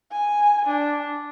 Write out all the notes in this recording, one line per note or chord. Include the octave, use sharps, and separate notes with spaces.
G#5
D4